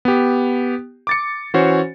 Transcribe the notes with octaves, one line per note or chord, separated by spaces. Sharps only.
B3 G4
D6 A6 C#7
E3 C#4 F#4 C5 C#5